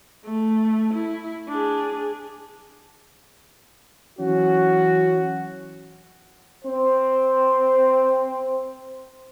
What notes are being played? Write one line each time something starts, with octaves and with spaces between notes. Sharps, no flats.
A3
E4
D4 G#4
E3 F#3 C#4 F#4
C4 C5